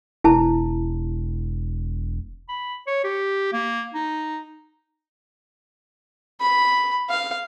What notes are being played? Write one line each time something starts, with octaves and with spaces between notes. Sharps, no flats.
E1 E4 A5
B5
C#5
G4
A#3
D#4
B5
F5